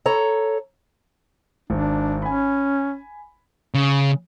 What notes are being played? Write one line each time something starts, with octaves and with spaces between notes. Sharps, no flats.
A4 C#5 A#5
G#1 D4
C#4 G#5 B5
C#3